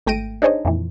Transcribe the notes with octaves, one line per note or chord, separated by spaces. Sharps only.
G#1 A3 G5 A#6 D7 D#7
D4 D#4 G#4 C5 C#5 D#5
F2 A#2 E3